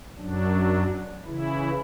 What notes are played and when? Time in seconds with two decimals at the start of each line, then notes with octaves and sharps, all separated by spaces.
0.18 F#2 F#3 D4
1.25 C#3 E3 E4